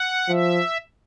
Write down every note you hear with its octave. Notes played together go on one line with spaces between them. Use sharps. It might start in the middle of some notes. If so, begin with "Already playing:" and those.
Already playing: F#5
F3 E5